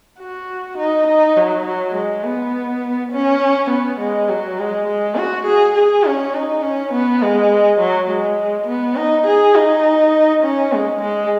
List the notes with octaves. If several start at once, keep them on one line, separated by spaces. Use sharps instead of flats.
F#4
D#4
D#4
F#3
F#3
G#3
B3
C#4
B3
G#3
F#3
G#3
G#3
F#4
G#4
G#4
C#4
D#4
C#4
B3
G#3
F#3
G#3
B3
D#4
G#4
D#4
C#4
G#3
G#3